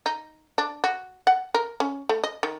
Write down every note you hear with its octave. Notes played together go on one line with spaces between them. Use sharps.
D#4
D4
F#4
F#5
A#4
C#4
A3
D#5
D#3